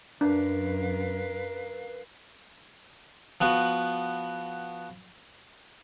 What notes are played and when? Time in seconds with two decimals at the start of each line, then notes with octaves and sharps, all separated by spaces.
0.21 F#2 D4 A#4 B4 F5
3.41 F3 B3 F#4